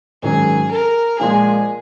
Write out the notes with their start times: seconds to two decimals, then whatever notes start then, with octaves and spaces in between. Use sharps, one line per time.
0.23 G#2 D#3 F#3 C#4 G#4
0.71 A#4
1.18 A#2 F3 G#3 G#4